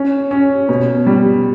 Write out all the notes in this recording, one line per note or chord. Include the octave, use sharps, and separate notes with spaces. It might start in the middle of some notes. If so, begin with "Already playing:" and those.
Already playing: C#4
C#4
B2
G3